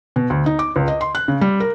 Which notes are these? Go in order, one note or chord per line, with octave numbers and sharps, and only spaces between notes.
B2
D2
D#4
D6
C#2
D#5
C6
F#6
C#3
G3
A#4